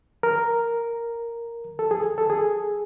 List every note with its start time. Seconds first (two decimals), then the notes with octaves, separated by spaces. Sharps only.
0.23 A#4
1.79 A4
1.91 G#4
2.18 A4
2.30 G#4